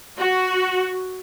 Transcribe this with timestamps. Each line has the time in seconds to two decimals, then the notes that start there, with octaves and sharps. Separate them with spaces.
0.17 F#4